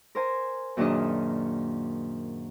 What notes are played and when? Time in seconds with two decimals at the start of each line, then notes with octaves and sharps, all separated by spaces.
0.15 A#4 C5 G#5 A#5
0.77 F#2 A#2 D#3 D4 G#4 D#5